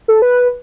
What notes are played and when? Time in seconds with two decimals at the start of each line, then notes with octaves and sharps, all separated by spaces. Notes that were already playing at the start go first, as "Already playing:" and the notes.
0.08 A4
0.22 B4